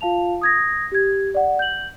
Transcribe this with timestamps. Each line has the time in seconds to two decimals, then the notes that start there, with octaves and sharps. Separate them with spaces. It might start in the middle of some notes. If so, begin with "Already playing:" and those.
0.01 F4 F5 A5 F7
0.41 D#6 G#6 A#6
0.92 G4 G#6
1.35 D5 F#5
1.59 G6 F#7